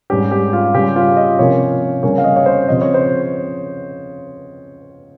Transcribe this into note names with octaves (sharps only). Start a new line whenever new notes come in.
G#2 G3 C#4 G4
G4
F4
C#3 G3 C#4 G4
F4
D#5
C3 F3 A#3 C#4 C#5
C#3 G3 A#3 C#4 C#5
F5
D#5
C#5
C5
C#3 F3 C4 D#5
C#5
C5